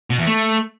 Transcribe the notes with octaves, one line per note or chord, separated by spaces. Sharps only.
B2
E2
A3